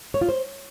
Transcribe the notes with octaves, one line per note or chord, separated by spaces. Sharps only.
C#5
F4
C5